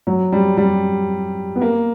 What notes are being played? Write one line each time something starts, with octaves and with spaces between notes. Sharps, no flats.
F#3
G3
G3
B3
A#3